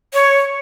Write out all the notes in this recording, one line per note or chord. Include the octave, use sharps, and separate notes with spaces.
C#5